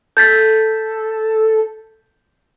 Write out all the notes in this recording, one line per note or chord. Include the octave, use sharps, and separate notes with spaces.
A4 G6 A6 B6